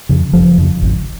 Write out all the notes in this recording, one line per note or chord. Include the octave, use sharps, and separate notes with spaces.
F2 C#3
F#1 F3
F2 C#3
G#1